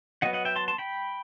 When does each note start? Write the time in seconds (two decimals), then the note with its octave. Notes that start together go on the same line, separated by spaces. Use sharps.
0.22 F#3 B3 D#5 F#5
0.33 D#5 F#5
0.45 E5 G5
0.56 A5 C6
0.68 A5 C6
0.78 G5 B5